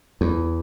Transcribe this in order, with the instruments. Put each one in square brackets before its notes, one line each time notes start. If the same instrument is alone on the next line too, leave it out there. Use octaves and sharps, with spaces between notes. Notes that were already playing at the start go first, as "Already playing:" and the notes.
[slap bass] E2